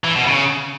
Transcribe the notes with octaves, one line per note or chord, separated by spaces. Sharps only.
E3
B2
C#3